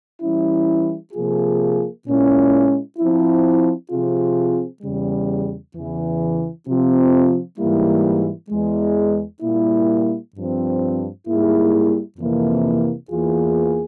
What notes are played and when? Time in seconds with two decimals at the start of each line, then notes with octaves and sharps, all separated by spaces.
0.21 E3 G3 C#4 E4
1.13 C3 F3 A#3 F4 G#4
2.05 A#2 G#3 C#4 E4
2.97 F3 C4 E4
3.89 C3 F3 C4 F4 G#4
4.81 E2 C#3 G3
5.73 E2 C#3 E3
6.65 C3 F3 C4 F4
7.57 G#2 E3 G3 A#3 E4
8.49 E2 E3 G#3
9.41 A#2 G3 A#3 E4
10.33 G2 F3 C4
11.25 G#2 G3 A#3 E4 G#4
12.17 F2 C3 E3 A#3 E4
13.09 E2 E3 A#3 F4 G#4